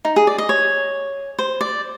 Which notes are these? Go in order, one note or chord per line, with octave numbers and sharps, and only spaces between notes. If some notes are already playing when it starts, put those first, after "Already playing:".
D#4
G#4
D5
D#5
C#5
C5
D5